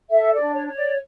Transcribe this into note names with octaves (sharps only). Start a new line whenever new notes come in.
A4 E5
D5
D4
C#5
C#5
D5